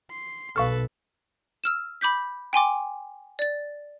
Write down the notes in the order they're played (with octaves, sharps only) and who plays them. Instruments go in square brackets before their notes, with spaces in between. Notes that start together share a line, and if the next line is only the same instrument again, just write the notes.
[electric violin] C6
[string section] B1 [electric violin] A4 B4 [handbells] F5 C#6 F6
[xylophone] E6 F6 E7
B5 D6 G6 B6
G5 G#5 C6 D6
D5 A6